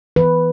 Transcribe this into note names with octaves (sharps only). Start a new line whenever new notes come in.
E3 B4